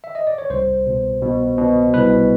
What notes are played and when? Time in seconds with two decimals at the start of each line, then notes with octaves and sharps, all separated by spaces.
0.04 E5
0.15 D#5
0.27 D5
0.38 C#5
0.50 C2 C5
0.86 B2
1.22 B2
1.58 B2
1.94 C2 B4